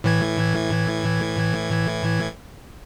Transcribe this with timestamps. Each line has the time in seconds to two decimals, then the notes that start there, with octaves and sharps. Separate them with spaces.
0.04 A2 E3 G#6